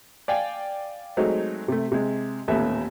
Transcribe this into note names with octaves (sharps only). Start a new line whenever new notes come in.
D5 F5 G5 G#5
F#3 G#3 A3 C4 D#4
C3 A3
C3 G#3
A1 D#2 A#2 A3 B3 E5